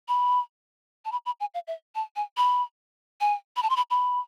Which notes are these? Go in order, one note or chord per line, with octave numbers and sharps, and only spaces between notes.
B5
A5
B5
B5
G#5
F5
E5
A5
G#5
B5
G#5
B5
A5
C6
B5
B5